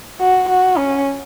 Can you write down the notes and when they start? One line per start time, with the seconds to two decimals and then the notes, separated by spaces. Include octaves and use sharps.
0.20 F#4
0.49 F#4
0.77 C#4